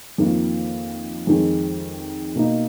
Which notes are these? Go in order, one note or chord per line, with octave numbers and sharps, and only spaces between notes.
F2 D#3 A#3 F4
F2 D#3 G#3
B2 A#3 D#4